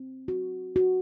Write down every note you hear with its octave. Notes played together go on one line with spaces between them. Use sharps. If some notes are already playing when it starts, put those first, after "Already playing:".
Already playing: C4
F#4
F#4